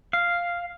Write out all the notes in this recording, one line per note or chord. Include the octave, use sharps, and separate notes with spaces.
F5